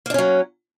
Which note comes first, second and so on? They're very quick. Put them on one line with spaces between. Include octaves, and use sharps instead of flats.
A#3 D4 C#4 F#3